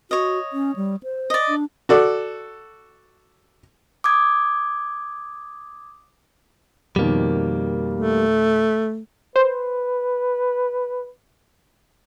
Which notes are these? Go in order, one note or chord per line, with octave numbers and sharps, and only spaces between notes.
F#4 C#5 D#5
C#4
G3
C5
D5 D#5
D4
F#4 A4 D5
D6 D#6 G#6
F2 B2 D#3 G3 A#3
A3
B4 C5